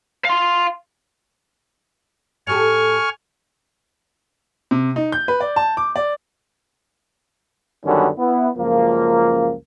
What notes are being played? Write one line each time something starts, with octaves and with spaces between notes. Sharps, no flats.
F5 C6
A2 G4 A4 G#5 C#6 F6
C3
D#4
G6
B4
D5
A5
D6
D5
F#2 D3 D#3 G3 B3 C#4
B3 E4
C#2 F#2 F3 A#3